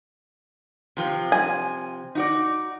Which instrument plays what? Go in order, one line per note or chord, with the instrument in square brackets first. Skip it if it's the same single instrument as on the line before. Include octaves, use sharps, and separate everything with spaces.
[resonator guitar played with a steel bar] C3 F3 C4
[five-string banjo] G#5
[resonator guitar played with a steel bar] D#4 F#4 D5